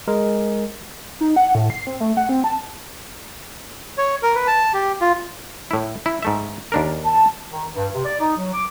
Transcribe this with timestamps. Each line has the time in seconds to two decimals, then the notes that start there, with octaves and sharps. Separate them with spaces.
0.08 G#3 A#4
1.21 D#4
1.36 F#5
1.55 A2
1.70 C7
1.87 C4
2.00 A3
2.17 F#5
2.29 C4
2.44 A5
3.98 C#5
4.23 A#4
4.35 B4
4.47 A5
4.74 G4
5.01 F4
5.71 A2 E4
6.06 E4
6.23 G#2 A3 E5
6.72 D#2 D4 A#4
7.05 A5
7.51 D#3
7.75 G2
7.94 C3
8.06 D5
8.20 D#4
8.37 F#3
8.54 D6